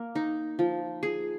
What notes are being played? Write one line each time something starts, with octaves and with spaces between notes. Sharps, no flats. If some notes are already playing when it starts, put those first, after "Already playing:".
Already playing: A#3
D#4
F3
G#4